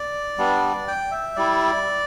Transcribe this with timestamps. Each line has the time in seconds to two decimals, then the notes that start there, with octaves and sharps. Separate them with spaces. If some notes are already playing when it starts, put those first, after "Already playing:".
Already playing: D5
0.38 G3 B3 D4
0.88 G5
1.11 E5
1.36 G3 E4 D5